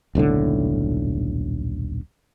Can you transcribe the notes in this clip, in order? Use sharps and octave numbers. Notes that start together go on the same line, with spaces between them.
D#1 B1 A2 D3